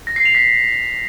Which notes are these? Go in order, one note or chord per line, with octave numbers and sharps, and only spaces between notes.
A#6
C7
F7
B6